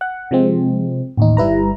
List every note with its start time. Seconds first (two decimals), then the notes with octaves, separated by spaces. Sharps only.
0.01 F#5
0.31 C3 F3 G#3 C4
1.17 A1 D#2 D#4
1.37 G1 G3 E4 B4 A#5